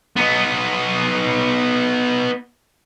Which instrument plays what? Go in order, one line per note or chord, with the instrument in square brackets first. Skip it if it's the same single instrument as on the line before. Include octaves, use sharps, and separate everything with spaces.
[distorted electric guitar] B3 D#4